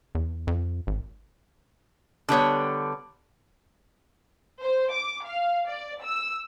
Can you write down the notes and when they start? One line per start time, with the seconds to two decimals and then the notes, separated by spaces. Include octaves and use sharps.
0.15 E2
0.47 F2
0.87 G#1
2.29 D3 G3 B3 C#5
4.62 C5
4.92 D6
5.26 F5
5.66 D5
6.04 E6